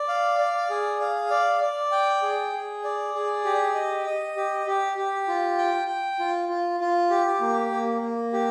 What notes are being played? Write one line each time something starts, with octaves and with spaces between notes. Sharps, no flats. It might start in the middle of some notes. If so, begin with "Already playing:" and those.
Already playing: D5
F5
D5
G#4
F5
D5
D5
G5
G#4
G#4
D5
G#4
G4
D#5
D#5
G4
G4
G4
F4
G5
G5
F4
F4
F4
G4
A#3
A#3
A#3
G4